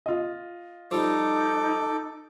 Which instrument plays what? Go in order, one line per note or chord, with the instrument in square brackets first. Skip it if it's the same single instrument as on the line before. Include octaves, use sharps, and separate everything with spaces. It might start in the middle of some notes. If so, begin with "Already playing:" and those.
[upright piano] F4 D#5
[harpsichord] F3 G3 [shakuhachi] D#4 [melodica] A4 D6